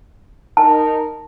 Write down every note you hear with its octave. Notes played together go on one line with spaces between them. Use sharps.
D#4 A#4 A5